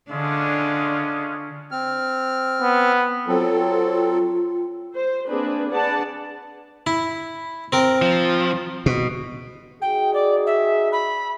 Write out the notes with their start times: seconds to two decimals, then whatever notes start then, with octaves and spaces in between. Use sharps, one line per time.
0.10 D3 G#3 C#4 D4 F4
1.71 C4 F6
2.62 B3
3.26 F#3 C4 F4 A4
4.94 C5
5.27 A#3 C4 D4 G#4 B4
5.70 D4 G#4 B4 D5 F#5 A5
6.87 E4
7.72 C4 A#4
8.02 F3
8.86 B2
9.82 D#4 F#4 G#4 G5
10.14 D5
10.46 E5
10.92 B5